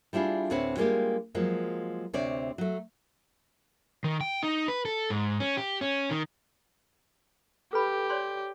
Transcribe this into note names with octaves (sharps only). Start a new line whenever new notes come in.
G3 D4 E4 F4 G#4
D2 A2 C4 B4 C#5 F#5
G3 G#3 A#3 B3 F4 G4
F3 F#3 G#3 A#3
D2 C3 C4 C#5 D5
F#3 A3
D#3
G5
D#4
B4
A4
G#2
C#4
G4
C#4
D#3
G4 A4 B4 B5
C#5 D5 C6